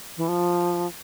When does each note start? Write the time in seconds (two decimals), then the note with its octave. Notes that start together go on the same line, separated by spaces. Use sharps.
0.17 E3
0.28 F3